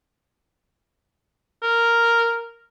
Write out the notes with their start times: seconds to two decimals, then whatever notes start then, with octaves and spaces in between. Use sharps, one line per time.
1.63 A#4